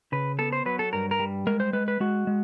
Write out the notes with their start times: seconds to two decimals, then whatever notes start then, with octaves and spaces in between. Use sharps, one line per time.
0.12 C#3 B4
0.39 B3 A4
0.53 C5
0.66 F#3 B4
0.79 A4
0.93 G2 A#4
1.11 A#4
1.19 G3
1.47 G#3 A#4
1.60 C5
1.73 G#3 B4
1.88 B4
2.00 G#3 F#4
2.27 G#3